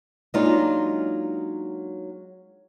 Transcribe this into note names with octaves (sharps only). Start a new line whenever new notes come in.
F#3 G#3 A#3 D4 D#4 F4